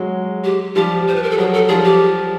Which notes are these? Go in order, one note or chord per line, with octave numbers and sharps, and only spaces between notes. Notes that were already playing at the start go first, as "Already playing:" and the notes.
Already playing: F#3 G#3
G4
F3 G3 G4
C5
B4
A#4
A4
F#3 G#4
A4
F3 G3 G#4
G4